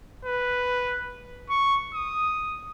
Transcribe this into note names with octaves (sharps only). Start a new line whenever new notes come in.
B4
C#6
D#6